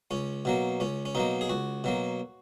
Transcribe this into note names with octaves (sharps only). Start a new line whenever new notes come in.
C#2 C#4
B2 F#3 A#3
C#2 C#4
C#4
B2 F#3 A#3 D#4
G#4
C#2 F#4
B2 F#3 A#3